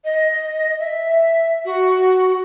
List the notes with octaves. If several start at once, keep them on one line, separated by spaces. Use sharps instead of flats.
D#5
E5
F#4